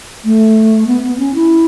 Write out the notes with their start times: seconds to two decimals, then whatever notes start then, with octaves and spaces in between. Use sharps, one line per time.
0.25 A3
0.87 B3
1.03 B3
1.18 C#4
1.34 E4